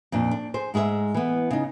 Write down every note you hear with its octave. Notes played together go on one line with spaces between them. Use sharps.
F2 A#2 D4
D4
G#4 C5
G#2 G#3 G#4 C5 E5
E3 B3
C#3 D#4